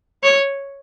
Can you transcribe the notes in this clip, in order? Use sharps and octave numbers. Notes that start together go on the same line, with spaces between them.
C#5